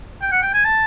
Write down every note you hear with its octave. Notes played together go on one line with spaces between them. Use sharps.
G5
F#5
G5
G#5
A5